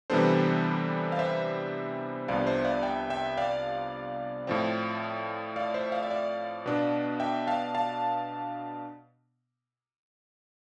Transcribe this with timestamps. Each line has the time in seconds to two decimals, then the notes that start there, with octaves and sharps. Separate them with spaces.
0.10 C3 E3 G3 B3 D4 A4 C5
1.12 F5
1.19 C5 E5
2.28 C2 C3 F3 B3 D4 D5 F5
2.47 C5 E5
2.65 D5 F5
2.83 E5 G5
3.10 E5 G5
3.37 D5 F5
4.47 A2 F3 C4
5.56 D5 F5
5.74 C5 E5
5.92 D5 F5
6.03 E5
6.10 D5 F5
6.66 B2 B3 D4
7.20 E5 G5
7.47 F5 A5
7.75 F5 A5